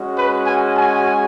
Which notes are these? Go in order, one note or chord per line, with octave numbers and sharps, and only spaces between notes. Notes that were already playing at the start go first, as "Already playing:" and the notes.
Already playing: G#3 C#4 F#4
B4
G#5
G#5